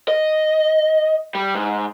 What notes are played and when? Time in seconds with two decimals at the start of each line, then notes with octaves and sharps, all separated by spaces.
0.08 D#5
1.35 G3
1.55 G#2